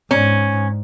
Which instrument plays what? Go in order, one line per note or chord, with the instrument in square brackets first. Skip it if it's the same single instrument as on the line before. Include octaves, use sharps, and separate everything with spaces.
[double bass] G#2 [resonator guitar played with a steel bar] C#4